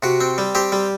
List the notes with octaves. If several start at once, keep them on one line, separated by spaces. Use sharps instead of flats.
C3 F#4
C4
G3
C4 G4
G3